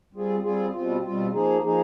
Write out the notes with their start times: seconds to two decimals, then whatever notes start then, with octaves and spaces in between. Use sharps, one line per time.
0.13 G3 C4 F4 G#4
0.43 G3 C4 F4 G#4
0.72 B2 G3 C4 F4
1.03 B2 G3 C4 F4
1.33 F3 A#3 D#4 G#4
1.63 F3 A#3 D#4 G#4